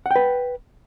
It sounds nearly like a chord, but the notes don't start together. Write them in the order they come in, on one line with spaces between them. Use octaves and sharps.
F#5 G5 B4